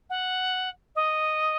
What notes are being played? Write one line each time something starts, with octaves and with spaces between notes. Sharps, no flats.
F#5
D#5